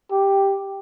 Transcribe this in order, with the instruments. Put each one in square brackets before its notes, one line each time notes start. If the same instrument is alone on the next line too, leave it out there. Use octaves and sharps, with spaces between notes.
[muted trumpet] G4